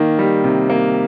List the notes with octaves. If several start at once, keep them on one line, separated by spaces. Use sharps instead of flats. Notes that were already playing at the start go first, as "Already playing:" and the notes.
Already playing: D#3 A#3
G3
C3
A#3